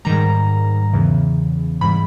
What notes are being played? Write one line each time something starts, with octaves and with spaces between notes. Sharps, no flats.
G#2 D#3 G3 A#5
E2 C#3 E3
G#2 E3 G3 B5